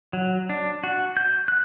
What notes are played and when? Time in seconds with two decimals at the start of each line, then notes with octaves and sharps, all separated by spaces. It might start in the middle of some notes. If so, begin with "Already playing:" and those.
0.13 F#3
0.49 D4
0.84 F#4
1.17 G6
1.48 F#6